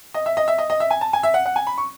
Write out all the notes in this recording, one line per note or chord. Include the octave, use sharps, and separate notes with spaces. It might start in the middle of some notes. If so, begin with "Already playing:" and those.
D#5
E5
D#5
E5
D#5
D#5
E5
G#5
A5
G#5
E5
F#5
F#5
G#5
B5
C#6